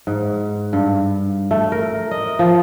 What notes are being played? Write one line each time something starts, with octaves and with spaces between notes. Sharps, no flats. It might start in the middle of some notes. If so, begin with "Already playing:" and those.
G#2
G2
A3
A#4
D#5
F3